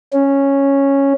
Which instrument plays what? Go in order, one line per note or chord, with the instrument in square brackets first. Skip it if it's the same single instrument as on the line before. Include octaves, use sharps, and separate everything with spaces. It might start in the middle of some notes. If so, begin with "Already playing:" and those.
[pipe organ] C#4